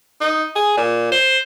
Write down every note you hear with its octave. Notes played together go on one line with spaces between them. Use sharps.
D#4
G#4
A#2
C5